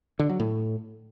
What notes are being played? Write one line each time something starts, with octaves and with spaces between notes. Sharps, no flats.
D3
F#3
A2